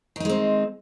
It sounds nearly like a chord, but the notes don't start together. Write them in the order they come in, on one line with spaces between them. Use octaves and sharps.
D#3 D#4 G#3 C4